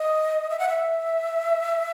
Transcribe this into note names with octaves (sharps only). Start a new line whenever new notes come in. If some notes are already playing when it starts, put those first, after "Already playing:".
Already playing: D#5
E5
F#5
E5